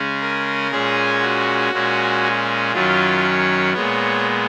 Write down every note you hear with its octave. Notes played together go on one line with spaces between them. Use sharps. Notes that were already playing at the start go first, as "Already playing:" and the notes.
Already playing: C#3 G#3 C#4
A#4
A#2 G#3 C#4 G#4
F#4
A#2 G#3 C#4
F#2 D#3 F#3 C#4 F4
C#5
A#2 G#3 B3 C#5